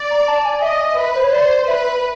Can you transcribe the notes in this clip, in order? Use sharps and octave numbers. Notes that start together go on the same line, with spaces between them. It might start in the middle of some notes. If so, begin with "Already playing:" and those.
Already playing: D5
A#5
A5
G#5
D#5 E5
B4
C5
C#5
C5 D5
B4 E5